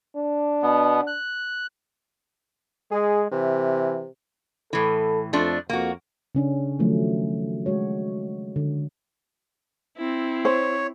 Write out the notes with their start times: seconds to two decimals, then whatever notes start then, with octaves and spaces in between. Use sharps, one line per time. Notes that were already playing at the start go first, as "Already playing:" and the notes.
0.16 D4
0.63 B2 B3
1.07 F#6
2.92 G#3 G#4
3.32 C3 E3
4.73 A2 E3 A4
5.33 F2 F3 A3 D4
5.70 F2 A#3 F#4
6.35 C#3 C#4 D4
6.79 D#3 F3 F#3 A3
7.66 G#3 F#4 C#5
8.56 D3
9.97 C4 E4
10.45 C5 C#5